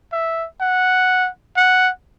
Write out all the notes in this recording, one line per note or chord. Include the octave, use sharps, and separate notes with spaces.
E5
F#5
F#5